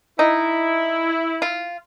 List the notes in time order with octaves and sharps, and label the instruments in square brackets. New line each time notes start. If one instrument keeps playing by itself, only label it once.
[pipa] D#4 [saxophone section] E4
[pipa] F4